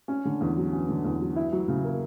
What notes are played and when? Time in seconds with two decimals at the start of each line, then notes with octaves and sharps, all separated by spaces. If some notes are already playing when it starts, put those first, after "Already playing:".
0.08 C#4
0.25 D3
0.41 E2
0.57 F#3
0.73 C#4
0.89 D3
1.04 E2
1.21 F#3
1.36 E4
1.52 F#3
1.68 C#3
1.84 A#3